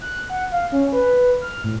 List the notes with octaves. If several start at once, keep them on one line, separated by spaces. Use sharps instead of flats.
F#6
F#5
F5
C#4
B4
F6
A2